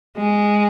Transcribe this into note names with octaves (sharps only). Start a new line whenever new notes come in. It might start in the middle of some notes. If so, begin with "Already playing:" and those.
G#3